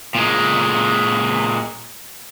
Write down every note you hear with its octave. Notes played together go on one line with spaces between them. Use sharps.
A#2 G#3